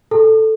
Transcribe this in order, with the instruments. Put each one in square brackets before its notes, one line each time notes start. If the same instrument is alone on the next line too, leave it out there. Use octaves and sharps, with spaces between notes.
[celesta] A4